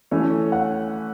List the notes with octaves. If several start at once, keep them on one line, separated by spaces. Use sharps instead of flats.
E3 A3 C#4 C#5
F#5